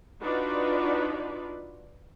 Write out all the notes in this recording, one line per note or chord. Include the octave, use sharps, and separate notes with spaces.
D4 D#4 F4 F#4 B4 D5